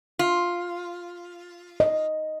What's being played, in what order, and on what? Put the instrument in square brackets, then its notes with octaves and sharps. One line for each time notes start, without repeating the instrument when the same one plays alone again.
[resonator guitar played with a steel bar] F4
[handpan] D#5